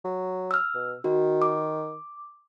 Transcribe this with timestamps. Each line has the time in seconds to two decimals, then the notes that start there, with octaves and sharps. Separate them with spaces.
0.04 F#3
0.51 E6 F6
0.75 B2
1.04 D#3 F#4
1.42 D6